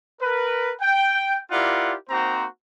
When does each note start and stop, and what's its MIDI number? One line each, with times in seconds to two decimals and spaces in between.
0.21 0.72 70
0.21 0.72 71
0.82 1.39 79
1.51 1.95 64
1.51 1.95 65
1.51 1.95 67
1.51 1.95 70
1.51 1.95 74
1.51 1.95 78
2.10 2.46 58
2.10 2.46 60
2.10 2.46 63
2.10 2.46 66
2.10 2.46 72
2.10 2.46 82